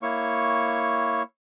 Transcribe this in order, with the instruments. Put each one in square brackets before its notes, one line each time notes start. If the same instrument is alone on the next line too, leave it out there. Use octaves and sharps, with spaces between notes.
[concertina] A#3 E4 C#5 C#6